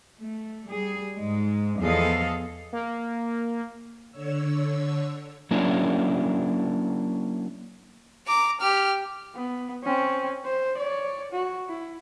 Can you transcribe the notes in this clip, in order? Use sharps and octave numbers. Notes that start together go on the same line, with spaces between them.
A3
G3 G#4
G#2 G#3
E2 F3 G#4 A4 D#5 F5
A#3
D3 C#5 E6
F#3 A#3 C#4 D4 E4
A#5 D6
G4 F6
B3
C4 C#4
C5
C#5 D5
F#4
E4